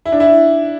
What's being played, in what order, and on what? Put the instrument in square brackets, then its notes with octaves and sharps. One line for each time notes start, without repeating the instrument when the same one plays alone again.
[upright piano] E4
D4
E4